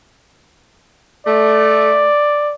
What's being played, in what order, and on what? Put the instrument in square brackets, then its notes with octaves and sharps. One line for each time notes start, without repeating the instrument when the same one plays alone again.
[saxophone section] A3 [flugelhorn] D5